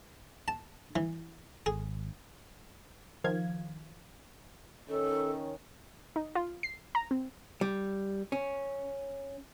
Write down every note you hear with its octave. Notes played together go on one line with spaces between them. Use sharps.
A5
E3
G#1 G#4
D#3 F3 F5 G#6
D#3 C#4 A4
D#4
F4
C7
A#5
C4
G3
C#4